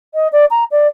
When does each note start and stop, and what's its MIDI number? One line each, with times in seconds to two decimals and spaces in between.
0.14 0.28 75
0.32 0.45 74
0.50 0.64 82
0.71 0.87 74